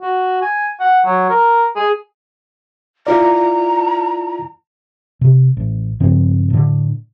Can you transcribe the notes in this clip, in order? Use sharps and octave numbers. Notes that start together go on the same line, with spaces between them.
F#4
G#5
F#5
F#3
A#4
G#4
E4 F4 D5 A#5
C3
A1
G2 C#3 F3 C4
A2 D3